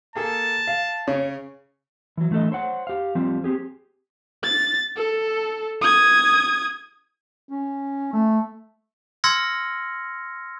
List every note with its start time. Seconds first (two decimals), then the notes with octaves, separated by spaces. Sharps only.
0.15 A#3 G#4 A4 A5
0.67 F5
1.07 C#3 C#5
2.17 E3 F#3
2.31 E3 A3 D4 A4 D#5
2.52 C5 C#5 F#5
2.87 G4 F5
3.15 F3 G3 C4
3.44 C4 G4 G#4
4.43 A6
4.96 A4
5.82 D#6 G#6
7.49 C#4
8.13 A3
9.24 C6 E6 F6 G#6 A#6 C#7